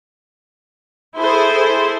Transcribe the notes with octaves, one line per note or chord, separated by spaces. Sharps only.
E4 G#4 A4 C5